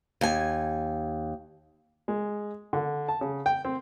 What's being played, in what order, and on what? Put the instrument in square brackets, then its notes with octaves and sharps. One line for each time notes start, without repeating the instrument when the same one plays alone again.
[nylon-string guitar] D#2 G#5
[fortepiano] G#3
D3
A5
C#3
G5
C4